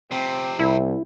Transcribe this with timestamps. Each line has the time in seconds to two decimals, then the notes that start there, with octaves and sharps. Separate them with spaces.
0.12 C3 F3 C4
0.59 C2 E4